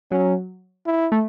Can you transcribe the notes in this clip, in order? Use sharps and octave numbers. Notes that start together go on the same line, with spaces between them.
F#3 C#4
E4
A3